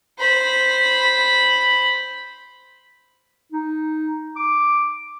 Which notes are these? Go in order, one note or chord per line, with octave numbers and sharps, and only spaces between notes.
C5 B5
D#4
D6